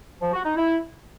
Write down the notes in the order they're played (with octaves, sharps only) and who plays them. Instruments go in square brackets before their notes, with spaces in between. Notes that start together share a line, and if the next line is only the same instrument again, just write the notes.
[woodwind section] F3
F#4
D#4
E4